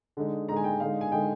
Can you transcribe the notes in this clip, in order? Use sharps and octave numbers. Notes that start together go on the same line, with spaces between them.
D3 G#3 D#4
D3 G#3 D#4 A#5
G#5
G5
D3 G#3 D#4 F5
G#5
D3 G#3 D#4 G5